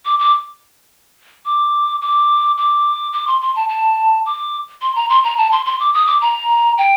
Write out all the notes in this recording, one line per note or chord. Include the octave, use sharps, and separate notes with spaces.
D6
D6
D6
D6
D6
D6
C6
C6
A5
A5
D6
C6
A#5
C6
A#5
A5
C6
C6
D6
D#6
D6
A#5
G5